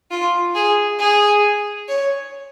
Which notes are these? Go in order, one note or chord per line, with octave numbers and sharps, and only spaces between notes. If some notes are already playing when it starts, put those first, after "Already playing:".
F4
G#4
G#4
C#5